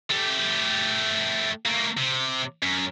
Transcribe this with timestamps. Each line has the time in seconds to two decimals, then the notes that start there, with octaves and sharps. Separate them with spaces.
0.10 A3 G4
1.65 A3 A#3
1.97 C3
2.63 F#2